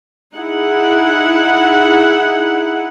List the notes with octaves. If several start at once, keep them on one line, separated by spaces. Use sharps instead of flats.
D#4 E4 G#4 F#5